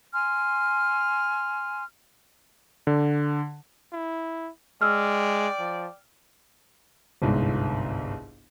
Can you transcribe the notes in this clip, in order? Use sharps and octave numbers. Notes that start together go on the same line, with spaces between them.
G#5 C6 F6
D3
E4
G#3 D5 G5 E6 F6
F3
G1 C2 G#2